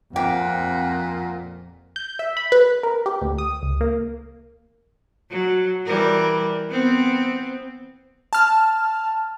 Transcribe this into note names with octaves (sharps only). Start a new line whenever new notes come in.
F2 A#2 G4 F#5
G6
E5
B5
B4
A#4
G4
D2
D#6
C#2
A#3
F#3
E3 G3 A#4
B3 C4
A5 F6